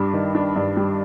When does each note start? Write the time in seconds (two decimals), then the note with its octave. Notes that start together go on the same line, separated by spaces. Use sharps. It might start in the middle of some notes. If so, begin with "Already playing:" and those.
Already playing: G2 G3 D4
0.13 D#3
0.35 D4
0.56 G2
0.77 G3